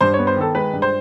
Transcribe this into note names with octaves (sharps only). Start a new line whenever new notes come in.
G2 C5
C#5
B3
C5
D#3 A4
G#3 B4
G2
C5